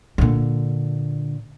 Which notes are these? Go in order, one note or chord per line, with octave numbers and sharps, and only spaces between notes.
A#2 D3